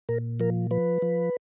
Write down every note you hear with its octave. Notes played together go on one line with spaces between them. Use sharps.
A#2 A#4
F3 A#4
F3 B4
F3